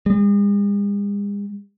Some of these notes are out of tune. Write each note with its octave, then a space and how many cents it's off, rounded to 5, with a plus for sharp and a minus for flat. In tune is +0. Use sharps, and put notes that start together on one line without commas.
G#3 -45